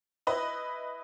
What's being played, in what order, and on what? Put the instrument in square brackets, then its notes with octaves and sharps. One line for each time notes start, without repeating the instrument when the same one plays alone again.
[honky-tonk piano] E4 B4 D#5